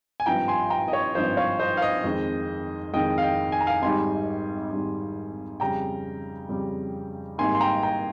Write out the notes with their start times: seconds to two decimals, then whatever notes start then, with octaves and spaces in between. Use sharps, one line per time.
0.20 G#5
0.26 G#1 G2 F3 G5 A#5
0.48 G#5 C6
0.70 G5 A#5
0.88 D#5
0.93 C#5
1.15 G#1 G2 F3 C5 D#5
1.37 C#5 F5
1.60 C5 D#5
1.77 F5
1.82 C5 D#5
2.04 F2 D#3 G#3
2.94 F2 D#3 G#3 D#5 G5
3.18 F5
3.22 D#5 G5
3.52 G#5
3.61 A#5
3.67 F5 G#5
3.82 G#1 G#2 G3 G#5 C6
4.71 G#1 G#2 G3
5.60 F2 C#3 G3 G5 A#5
6.49 F2 C#3 G3
7.38 G#1 G#2 G3 A#3 G#5 C6
7.55 C6
7.61 G5 A#5
7.83 G5 A#5